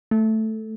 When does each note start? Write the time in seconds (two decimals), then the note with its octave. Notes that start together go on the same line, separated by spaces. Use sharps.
0.11 A3